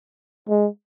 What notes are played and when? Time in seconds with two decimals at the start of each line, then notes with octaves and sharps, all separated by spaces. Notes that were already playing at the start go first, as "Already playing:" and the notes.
0.49 G#3